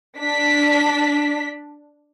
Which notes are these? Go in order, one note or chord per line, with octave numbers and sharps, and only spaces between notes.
D4 B6